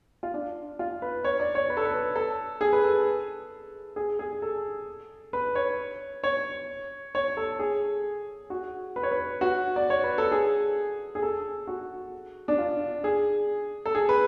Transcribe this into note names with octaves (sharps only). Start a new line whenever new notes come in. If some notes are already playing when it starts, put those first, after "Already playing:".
F4
D4
F4
B4
C#5
D5
C#5
B4
A4
B4
A4
G#4
B4
A4
G#4
G#4
A4
B4
C#5
C#5
C#5
A4
G#4
F#4
B4
C#5
B4
F#4
D5
C#5
B4
A4
G#4
G#4
A4
F#4
D4
F4
G#4
A4
G#4
B4